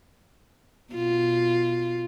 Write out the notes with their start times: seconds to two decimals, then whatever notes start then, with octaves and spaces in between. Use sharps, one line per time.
0.93 B2 F4